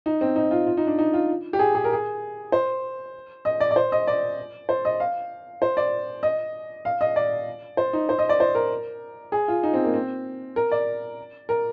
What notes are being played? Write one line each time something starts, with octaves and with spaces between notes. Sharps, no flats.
D#4
C4
D#4
F4
F4
D#4
D4
D#4
F4
G4
G#4
G#4
A#4
G#4
C5
D#5
D5
D5
C5
D#5
D5
C5
D#5
F5
C5
D5
D#5
F5
D#5
D5
C5
D#4
C5
D#5
D5
C5
A#4
G#4
F4
D#4
C4
A#3
C4
A#4
D5
A#4